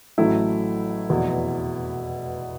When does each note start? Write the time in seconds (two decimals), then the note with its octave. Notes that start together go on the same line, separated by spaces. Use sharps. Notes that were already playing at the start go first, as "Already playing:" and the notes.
0.18 A1 A2 F#3 A3 E4
1.10 F1 E2 B2